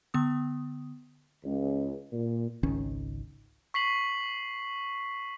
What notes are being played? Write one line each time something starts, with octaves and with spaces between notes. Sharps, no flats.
D3 B3 D#6
C#2
A#2
G#1 C#2 D#3 C#4
C#6 B6 C7 F#7